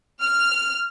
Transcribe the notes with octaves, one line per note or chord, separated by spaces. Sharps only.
F6